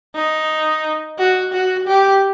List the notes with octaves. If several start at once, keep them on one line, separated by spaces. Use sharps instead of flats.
D#4
F#4
F#4
G4